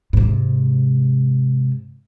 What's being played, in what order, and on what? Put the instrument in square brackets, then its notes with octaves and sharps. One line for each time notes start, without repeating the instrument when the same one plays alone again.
[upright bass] G#2 C3